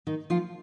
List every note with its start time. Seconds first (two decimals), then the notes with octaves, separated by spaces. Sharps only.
0.07 D#3 D#4
0.30 F3 F4